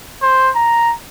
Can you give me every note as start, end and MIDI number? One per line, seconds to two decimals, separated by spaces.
0.22 0.50 72
0.55 0.94 82